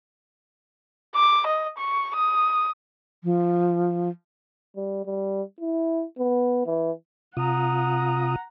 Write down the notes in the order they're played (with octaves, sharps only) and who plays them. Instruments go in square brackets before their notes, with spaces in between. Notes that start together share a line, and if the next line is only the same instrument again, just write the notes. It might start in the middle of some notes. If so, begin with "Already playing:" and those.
[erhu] D6
D#5
C#6
D#6
[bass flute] F3
[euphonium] G3
G3
E4
B3
E3
[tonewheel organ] C3 F4 D#6 [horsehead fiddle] F#5 A#5